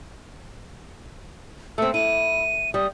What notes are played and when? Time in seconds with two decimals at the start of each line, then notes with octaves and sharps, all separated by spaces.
1.78 A3 C4 E6
1.94 E4 D#7
2.74 G3 D#6